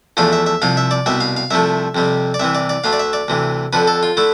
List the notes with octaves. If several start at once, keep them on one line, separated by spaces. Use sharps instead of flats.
E2 D3 F3 A3 F5
E5
E5
C2 C3 F3 F5
E5
D5
C2 B2 G3 E5
F5
F5
C2 C3 F3 A3 E5
F2 C3 G3
D5
C2 C3 E3 E5
D5
D5
D2 D3 A3 F5
D5
E5
D5
D2 C3 E3
F2 D3 F3 B4
A4
F4
D3 A3 E4